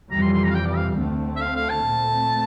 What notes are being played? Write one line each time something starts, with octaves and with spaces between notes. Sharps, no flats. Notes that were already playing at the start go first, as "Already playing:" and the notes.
F2 C3 E3 G3 A#5
C6
C6
A#5
F5
G5
D5
F5
D2 D3 A3 C4
E5
F5
F5
A5
A#2 A3 C4